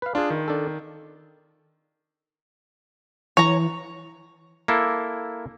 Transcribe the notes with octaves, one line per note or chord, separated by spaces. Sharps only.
B4 F5
D4 F4 G#4
D#3
D4 A4
E3 C#5 A#5
A#3 E4 A4